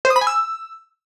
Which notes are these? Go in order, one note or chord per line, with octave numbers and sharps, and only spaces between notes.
C5
D#6
B5
G#5
E6